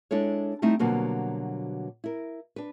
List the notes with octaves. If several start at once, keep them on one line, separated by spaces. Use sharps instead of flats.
G#3 D4 E4 A4 C#5
G3 A3 C4 D#4 E4
B2 D3 F#3 G3 A#3 C4
E4 A#4
D4 B4